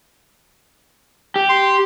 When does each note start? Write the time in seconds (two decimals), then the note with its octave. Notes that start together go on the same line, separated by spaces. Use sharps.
1.36 G4
1.49 C6